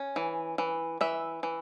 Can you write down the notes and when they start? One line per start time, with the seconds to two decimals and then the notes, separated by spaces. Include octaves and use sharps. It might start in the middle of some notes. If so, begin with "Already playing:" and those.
Already playing: C#4
0.16 E3
0.58 E3
1.01 E3 E5
1.43 E3